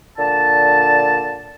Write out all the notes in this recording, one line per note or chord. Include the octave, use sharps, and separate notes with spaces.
A#2 D3 A5